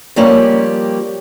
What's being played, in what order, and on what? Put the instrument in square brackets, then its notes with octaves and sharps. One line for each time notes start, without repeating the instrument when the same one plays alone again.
[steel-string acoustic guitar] F3 G3 A#3 C#4 G4